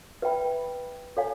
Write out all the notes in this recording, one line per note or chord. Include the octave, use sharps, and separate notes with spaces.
B4 E5 G5 B5
A4 C#5 F5 G#5